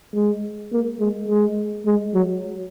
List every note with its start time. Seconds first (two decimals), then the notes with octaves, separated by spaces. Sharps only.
0.15 G#3
0.72 A#3
1.00 G#3
1.28 G#3
1.86 G#3
2.14 F#3